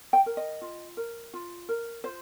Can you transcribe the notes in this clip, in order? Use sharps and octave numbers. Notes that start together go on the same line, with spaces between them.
G5
A#4
D#5
F4
A#4
F4
A#4
F4 C5